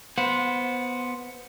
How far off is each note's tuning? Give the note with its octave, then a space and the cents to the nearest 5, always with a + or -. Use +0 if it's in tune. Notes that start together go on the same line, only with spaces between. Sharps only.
B3 +0 C5 +0 F#5 -25